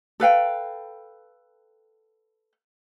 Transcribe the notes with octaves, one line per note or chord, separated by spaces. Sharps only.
A4 B4 F5 G5